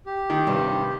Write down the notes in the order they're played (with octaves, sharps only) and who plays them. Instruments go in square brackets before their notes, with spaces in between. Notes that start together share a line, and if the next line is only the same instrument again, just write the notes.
[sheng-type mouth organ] G4
[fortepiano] D#3
[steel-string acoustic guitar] G2 C3 G3